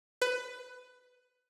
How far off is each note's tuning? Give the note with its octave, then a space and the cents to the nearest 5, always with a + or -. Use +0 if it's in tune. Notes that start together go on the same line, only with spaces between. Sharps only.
B4 +15